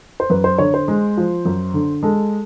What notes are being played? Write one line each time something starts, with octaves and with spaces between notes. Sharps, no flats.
C5
F#2 B4
C5
D3 C#5
C5
G#3
F3
F#2
D3
G#3 A4